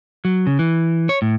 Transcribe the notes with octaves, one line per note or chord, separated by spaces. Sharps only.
F#3
C#3
E3
C#5
A2